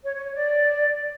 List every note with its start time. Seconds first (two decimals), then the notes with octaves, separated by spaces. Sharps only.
0.03 C#5
0.14 C#5
0.24 C#5
0.34 D5